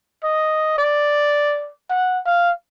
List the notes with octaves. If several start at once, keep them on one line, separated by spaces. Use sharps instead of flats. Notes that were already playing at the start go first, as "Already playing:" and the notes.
D#5
D5
F#5
F5